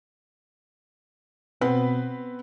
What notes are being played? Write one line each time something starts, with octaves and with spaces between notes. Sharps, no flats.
B2 B3 C4 B4